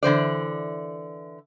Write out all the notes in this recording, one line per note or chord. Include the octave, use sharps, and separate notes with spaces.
D3 E3 C5 D5